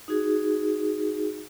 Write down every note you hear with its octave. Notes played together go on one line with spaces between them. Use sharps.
D#4 F#4 G#4